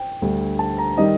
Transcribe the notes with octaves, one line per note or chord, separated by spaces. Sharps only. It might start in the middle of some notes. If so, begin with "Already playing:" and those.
Already playing: G5
D2 D3 G3
A5
A#5
D#3 G3 D#5